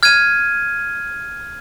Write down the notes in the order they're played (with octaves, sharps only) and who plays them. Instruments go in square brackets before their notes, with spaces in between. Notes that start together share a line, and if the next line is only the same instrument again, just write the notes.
[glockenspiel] F6 G#6 D#7